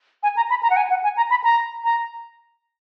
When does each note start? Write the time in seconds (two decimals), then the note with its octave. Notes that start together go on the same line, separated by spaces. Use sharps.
0.23 G#5
0.37 A#5
0.50 B5
0.63 A#5
0.70 F#5
0.77 G#5
0.90 F#5
1.04 G#5
1.17 A#5
1.30 B5
1.44 A#5
1.84 A#5